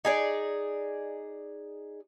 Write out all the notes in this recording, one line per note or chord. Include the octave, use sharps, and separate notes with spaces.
D#4 G#4 D5